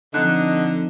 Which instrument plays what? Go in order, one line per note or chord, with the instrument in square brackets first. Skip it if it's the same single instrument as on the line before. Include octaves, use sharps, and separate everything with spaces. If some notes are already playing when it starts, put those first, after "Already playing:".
[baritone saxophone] D3 [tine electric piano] F3 C4 D#4 [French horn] D#5 [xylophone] F#6